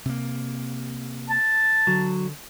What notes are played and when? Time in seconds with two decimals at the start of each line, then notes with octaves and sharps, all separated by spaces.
0.05 C3 A#3
1.30 A5
1.87 D3 F#3